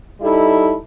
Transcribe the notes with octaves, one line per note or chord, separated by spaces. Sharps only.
G3 D#4 E4 A4